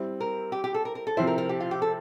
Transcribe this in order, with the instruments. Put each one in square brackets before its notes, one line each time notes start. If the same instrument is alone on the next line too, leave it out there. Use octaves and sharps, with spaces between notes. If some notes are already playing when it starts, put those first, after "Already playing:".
Already playing: [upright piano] G3 C4 E4
[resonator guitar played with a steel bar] A#4
G4
G4
A4
A#4
A#4
A4
[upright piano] C3 F3 C4 E4 [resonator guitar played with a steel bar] C5
[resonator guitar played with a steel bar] A#4
A#4
G4
F4
G4
A4